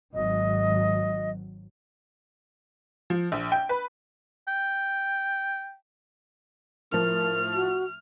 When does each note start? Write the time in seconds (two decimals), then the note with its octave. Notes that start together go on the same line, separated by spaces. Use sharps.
0.14 G#1 F#3 D#5
3.10 F3
3.32 A#1
3.52 G5
3.69 B4
4.48 G5
6.92 A2 F3 A#4 F6
7.55 F#4